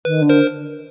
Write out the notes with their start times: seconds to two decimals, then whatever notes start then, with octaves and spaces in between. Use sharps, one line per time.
0.05 D#3 B4
0.21 D3
0.29 A#4 C5